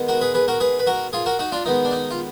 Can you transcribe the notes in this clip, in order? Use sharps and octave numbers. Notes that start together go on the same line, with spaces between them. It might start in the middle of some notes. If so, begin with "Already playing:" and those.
Already playing: D#3 G#3 B3
F#4 A#4
G#4 B4
G#4 B4
F#4 A#4
G#4 B4
B4
F#4 A#4
F4 G#4
F#4 A#4
D#4 F#4
D4 F4
D#3 G#3 B3 D#4
D4
D#4
F4